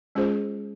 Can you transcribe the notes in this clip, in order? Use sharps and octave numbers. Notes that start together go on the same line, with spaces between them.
G#3 C#4 F4 G#4 C5